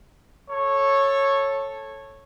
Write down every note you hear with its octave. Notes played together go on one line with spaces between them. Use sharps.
A4 C#5